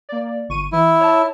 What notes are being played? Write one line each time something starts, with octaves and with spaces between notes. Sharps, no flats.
A#3 D5
G1 C#6 D#7
E3 E4
C#5 A5